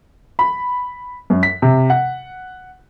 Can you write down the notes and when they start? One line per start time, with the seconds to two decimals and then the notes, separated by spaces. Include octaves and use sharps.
0.39 B5
1.30 F#2
1.43 B6
1.62 C3
1.90 F#5